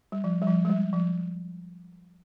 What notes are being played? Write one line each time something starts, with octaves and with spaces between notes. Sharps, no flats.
G3
F3
G3
F3
G#3
G3
F3